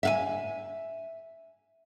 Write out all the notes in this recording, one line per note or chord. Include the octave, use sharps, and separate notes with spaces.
E5 F5 G#5